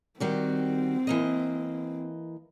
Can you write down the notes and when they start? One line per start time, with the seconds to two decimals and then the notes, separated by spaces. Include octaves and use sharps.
0.20 D#3 G3 C4 F#4
1.07 E3 A#3 D#5